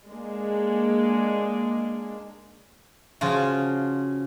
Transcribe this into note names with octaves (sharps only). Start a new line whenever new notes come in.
G#3 A#3 D4
C#3 F3 F4 F#4